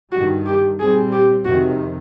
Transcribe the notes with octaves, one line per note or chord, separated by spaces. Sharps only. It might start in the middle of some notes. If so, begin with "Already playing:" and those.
G2 D#3 G3 F#4
G4
A#2 G3 C4 G#4
G4
F2 C3 D#3 F#4